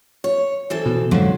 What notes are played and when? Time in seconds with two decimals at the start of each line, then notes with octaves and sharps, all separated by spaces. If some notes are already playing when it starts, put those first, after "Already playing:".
0.24 C#5
0.70 E3 C4 A4
0.86 B2
1.11 F2 G#2 D3 F#3 C4